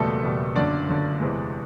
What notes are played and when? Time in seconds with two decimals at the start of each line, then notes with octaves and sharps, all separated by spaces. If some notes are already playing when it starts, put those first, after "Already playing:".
Already playing: F#1 E2 B2 G3 A3 A4
0.23 F#1 E2 B2 G3
0.56 G1 F#2 D3 D4 D5
0.88 G1 F#2 D3
1.20 E2 C3 E3 G#3